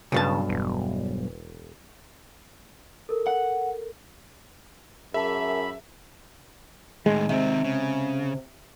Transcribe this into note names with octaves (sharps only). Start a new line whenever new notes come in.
B1 G2 C#3 A5
E1
A4 A#4
F#5
F#2 G#4 A#4 E5 A5 B5
A2 D#3 G#3
C3 D#3 C4
C#3